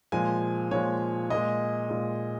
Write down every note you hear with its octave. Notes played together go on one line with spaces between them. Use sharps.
A#2 F3 G#3 G#5
A#2 F3 G#3 C#5
A#2 G#3 D#5
A#2 G#3